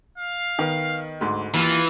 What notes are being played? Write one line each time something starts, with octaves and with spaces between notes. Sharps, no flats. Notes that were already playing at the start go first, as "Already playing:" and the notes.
F5
D#3 B3
D2 G#2
D#2 E3 F4